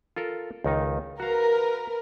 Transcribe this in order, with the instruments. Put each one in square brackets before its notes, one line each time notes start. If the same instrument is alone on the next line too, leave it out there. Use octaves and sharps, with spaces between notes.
[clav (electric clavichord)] F4 A4 A#4
C#2 D#3 D#4
[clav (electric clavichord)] F#4 F5 [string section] A#4 B4